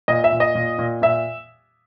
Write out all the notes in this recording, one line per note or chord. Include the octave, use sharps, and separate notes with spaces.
A#2 D#5
E5
A#2
D#5
A#2
A#2
A#2 E5